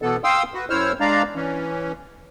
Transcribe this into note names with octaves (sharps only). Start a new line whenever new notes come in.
B2 E3 B3 A4
F5 G5 C6 D#6 E6
F#4 B4
F#2 E4 C5 C#5 E6 F6
G#3 D4 D5 F5 A#5
E3 C#4